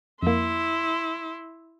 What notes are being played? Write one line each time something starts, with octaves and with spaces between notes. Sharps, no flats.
F2 A#3 E4 C6